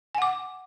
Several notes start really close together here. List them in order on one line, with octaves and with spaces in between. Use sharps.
G#5 F#5 D6